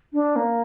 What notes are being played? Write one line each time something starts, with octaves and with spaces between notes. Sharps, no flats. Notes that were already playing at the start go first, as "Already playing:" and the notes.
D4
A#3